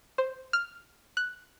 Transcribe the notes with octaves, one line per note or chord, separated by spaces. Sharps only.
C5
F6
F#6